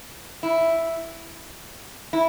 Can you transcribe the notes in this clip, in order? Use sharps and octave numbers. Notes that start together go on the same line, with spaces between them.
E4
E4